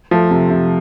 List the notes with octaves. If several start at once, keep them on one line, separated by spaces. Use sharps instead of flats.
F3 A3
C3
C3